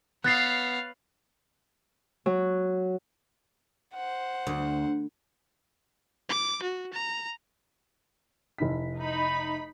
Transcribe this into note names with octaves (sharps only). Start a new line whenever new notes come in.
B3 C#5 F5 F#6 A6 C7
F#3
C5 F#5
D2
D6
F#4
A#5
F1 E4 B6
D#4 B5